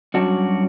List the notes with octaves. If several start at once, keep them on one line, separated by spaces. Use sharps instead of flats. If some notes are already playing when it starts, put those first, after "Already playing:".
G2 F#3 C#4 D4 F#4